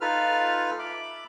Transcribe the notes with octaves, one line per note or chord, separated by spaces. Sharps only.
D#4 F4 A4 B4 F6
E5 B5 D6